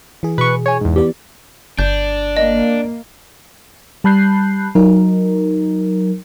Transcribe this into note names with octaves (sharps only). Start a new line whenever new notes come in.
E3 G#4
B2 B4 C#6
C#5 G#5
E2 G#2
E3 B3 G4 D5
G1 D4 G6
A#3 D#5
G3 A5 B5 F#6 G6 C7
F#3 D#4 A#4